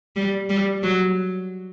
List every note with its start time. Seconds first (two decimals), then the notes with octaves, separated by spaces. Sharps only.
0.16 G3
0.50 G3
0.83 F#3